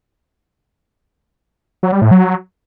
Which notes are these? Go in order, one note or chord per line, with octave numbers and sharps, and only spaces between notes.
F#3
G3
A2
F#3